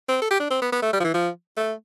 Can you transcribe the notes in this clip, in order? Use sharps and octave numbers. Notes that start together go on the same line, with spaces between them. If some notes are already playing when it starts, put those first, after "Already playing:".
C4
A4
G4
D4
C4
B3
B3
A3
G3
F3
E3
F3
A3